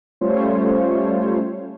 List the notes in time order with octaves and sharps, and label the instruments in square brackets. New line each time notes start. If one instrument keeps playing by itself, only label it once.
[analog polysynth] G3 A3 C#4 F4 C5 C#5